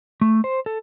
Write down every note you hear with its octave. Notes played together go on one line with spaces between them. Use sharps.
A3
C5
A4